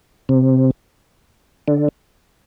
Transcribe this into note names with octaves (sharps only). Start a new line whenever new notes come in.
C3
D3